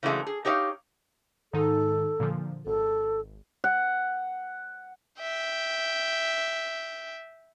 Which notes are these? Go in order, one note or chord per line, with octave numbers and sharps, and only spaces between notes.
C#3 E3 F#3 G#3 A3
G#4
D#4 G4 C#5 E5 F5
G#2 D#3 D#4 A4
A#2 D3 F3
G#1 A4
F#5
E5 G5